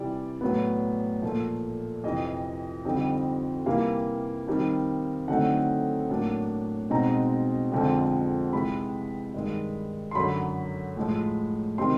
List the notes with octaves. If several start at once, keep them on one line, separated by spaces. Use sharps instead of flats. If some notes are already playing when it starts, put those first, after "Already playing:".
Already playing: C3 E3 G3 D5
A2 F#3 B3
A#2 F3 A3
F2 C3 E3 D#5
F2 D3 G3 C4 D#4
C3 E3 G3 A#3 F5
D#3 G3 C4 D#4
D3 F#3 A3 C4 D#4 F#5
A2 F#3 A#3 D4
B2 G#3 C4 D#4 A#5
F2 D3 F3 G#3 C4
C3 E3 G#3 B5
G2 D#3 G#3
C6
F#2 D3 F#3 B5
A2 F3 G#3
C3 D#3 G3 C4 D#4 C6